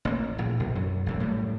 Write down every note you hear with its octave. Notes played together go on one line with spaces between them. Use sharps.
A1 A#3
A#1 A2
B1
F#2
A1 F#2 A2
A2 G3